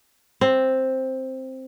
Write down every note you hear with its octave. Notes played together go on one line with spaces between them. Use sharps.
C4